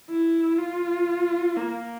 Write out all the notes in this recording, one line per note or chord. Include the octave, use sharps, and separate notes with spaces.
E4
F4
A#3